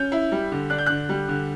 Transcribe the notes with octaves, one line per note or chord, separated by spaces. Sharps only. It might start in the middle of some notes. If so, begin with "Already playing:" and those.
Already playing: C#4 G6
E4
G3
D3
D4 F#6
G6
D3 F#6
G3
D3